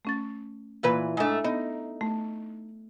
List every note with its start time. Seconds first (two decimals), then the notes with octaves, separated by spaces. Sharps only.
0.05 A3 C#4 A6
0.83 A#2 E3 B4
1.17 G#2 A3 D4 G#5
1.44 B3 D#4
2.01 A3